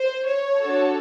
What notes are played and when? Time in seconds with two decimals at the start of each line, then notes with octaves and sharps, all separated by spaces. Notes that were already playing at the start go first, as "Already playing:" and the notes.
Already playing: C5
0.26 C#5
0.58 D4 F#4 A4